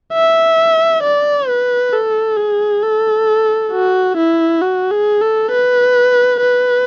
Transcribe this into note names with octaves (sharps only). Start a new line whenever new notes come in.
E5
D5
B4
A4
G#4
A4
F#4
E4
F#4
G#4
A4
B4
B4